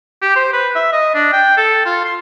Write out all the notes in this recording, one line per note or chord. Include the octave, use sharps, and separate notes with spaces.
G4
C5
B4
E5
D#5
D4
G5
A4
F4
C6